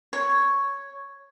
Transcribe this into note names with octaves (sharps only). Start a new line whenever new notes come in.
C#5